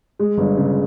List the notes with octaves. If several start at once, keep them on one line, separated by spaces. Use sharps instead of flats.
G#3
G1
C#3